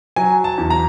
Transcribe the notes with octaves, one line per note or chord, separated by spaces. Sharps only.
F#3 G#5
A5
E2
A#5